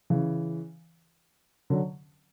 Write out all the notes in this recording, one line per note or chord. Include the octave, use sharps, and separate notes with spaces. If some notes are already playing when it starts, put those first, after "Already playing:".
C#3 E3
D3 F#3